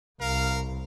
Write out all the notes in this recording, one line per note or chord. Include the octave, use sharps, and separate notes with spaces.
C2 A#4 F5